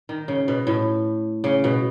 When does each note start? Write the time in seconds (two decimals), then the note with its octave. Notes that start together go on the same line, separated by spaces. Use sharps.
0.09 D#3
0.28 C#3
0.48 B2
0.67 A2
1.44 C#3
1.64 B2